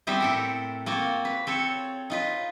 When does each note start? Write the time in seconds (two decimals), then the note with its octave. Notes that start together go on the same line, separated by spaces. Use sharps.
0.07 G3 A3 B3 C4 E4 C5
0.21 A2 A4 A#4
0.86 A#3 C4 F4 F#4
1.25 B4
1.47 C4 A4 C#5
2.10 D#4 F4 B4